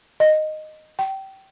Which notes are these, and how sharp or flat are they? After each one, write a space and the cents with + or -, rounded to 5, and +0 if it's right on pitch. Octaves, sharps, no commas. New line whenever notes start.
D#5 -10
G5 -25